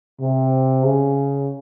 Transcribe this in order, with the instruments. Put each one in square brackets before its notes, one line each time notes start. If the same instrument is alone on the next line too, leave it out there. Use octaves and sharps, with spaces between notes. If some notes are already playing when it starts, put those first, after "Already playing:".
[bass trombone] C3
C#3